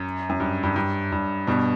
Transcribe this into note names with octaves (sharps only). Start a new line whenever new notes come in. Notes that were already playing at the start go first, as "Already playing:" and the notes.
Already playing: F#2
F#2
G2
G2
G2
G2
G2 B2